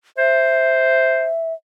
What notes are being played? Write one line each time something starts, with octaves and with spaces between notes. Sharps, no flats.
C5 E5